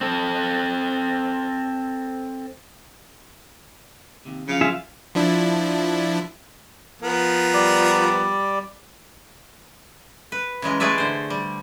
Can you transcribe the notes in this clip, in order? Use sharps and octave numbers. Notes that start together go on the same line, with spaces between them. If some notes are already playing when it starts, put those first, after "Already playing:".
C4 A4
D#2 C3
C#3 F3 F#3 F5
F4 G#4 E5
F3 D4 E4
F3 B3 A#4
G3 D5
B4
C#3 E3 G#3 A#4
G#3 A3 G#4 B4 D5 E5
D3 C5
G3